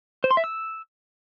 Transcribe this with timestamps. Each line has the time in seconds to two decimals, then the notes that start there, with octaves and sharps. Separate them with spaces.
0.24 C5
0.31 C6
0.37 E5
0.44 E6